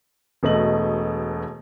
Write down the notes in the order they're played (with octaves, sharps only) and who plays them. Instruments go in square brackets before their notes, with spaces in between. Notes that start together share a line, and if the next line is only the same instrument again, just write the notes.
[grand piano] E1 B2 A3 D#5 F#7